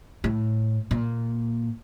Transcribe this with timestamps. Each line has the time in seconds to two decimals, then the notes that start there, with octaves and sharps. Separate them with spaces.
0.24 A2
0.91 A#2